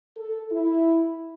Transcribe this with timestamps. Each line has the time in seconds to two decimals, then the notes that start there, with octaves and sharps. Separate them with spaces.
0.17 A4
0.51 E4